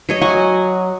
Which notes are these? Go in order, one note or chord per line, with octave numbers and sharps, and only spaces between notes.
F#3 C#5 D#5
F#3 F#5 G#5 C#6